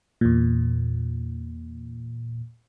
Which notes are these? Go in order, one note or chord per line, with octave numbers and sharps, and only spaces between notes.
E2 A#2